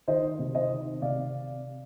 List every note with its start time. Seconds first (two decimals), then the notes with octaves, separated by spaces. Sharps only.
0.08 D#3 C5 D#5
0.39 C3
0.55 C5 D#5
0.71 D#3
1.02 C3 D5 F5